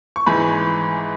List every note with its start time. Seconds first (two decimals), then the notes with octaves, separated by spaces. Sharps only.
0.16 C#6
0.26 G#1 G#2 E3 G#5 B5